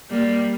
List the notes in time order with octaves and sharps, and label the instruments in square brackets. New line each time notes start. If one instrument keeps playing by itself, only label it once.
[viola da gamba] G3 A#3